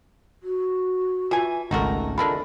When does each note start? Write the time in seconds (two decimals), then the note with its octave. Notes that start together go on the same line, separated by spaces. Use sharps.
0.43 F#4
1.31 E3 F4 G#5
1.71 G#1 C#2 A3 D#4 F#4 A4 A#4
2.18 E3 G#3 D4 F4 A4 A#4 B5